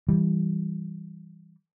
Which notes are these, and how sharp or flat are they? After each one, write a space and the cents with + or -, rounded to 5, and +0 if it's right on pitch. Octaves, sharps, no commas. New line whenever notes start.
E3 +0 G3 +0